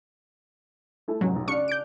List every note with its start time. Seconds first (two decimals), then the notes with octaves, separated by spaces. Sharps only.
1.08 A3 E4 A4
1.21 F1 G#2 F#3 C#4
1.36 B1
1.48 C#3 D4 D5 F5 C#6 C#7
1.68 G6 D7